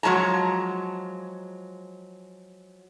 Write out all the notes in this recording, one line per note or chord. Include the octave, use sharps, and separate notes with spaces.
F3 F#3 G#3 A5 A#5